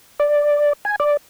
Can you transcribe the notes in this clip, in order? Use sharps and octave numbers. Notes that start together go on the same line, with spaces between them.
D5
G#5
D5